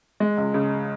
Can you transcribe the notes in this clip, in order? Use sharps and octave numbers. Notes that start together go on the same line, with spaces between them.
G#3
C#2
C#3